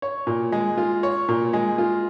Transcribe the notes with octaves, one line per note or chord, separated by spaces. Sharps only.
C#5
A#2
G#3
F4
C#5
A#2
G#3
F4